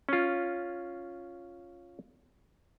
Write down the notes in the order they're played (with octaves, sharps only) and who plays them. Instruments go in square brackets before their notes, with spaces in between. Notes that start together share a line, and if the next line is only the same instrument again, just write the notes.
[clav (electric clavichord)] C#4 F4